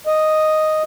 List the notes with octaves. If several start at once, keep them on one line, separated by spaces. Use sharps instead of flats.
D#5